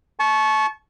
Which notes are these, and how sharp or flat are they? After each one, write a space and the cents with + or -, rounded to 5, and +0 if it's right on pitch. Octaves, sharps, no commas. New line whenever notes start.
A5 -30 C#6 -5